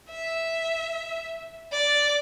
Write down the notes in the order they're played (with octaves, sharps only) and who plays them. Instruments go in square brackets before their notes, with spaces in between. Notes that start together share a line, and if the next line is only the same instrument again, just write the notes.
[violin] E5
D5